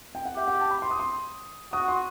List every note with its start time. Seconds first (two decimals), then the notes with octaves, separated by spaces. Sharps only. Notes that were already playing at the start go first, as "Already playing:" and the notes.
0.15 G5
0.25 F#5
0.36 G4 E5
0.48 F#5
0.60 A5
0.71 B5
0.82 C6
0.91 D#6
0.99 C6
1.73 F#4 D#6
1.88 C6